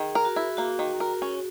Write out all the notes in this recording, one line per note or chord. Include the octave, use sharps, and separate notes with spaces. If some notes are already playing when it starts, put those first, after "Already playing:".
Already playing: D#3 G#4
A#4
F#4
E4
A#3 F#4
D#3
A#4
C#4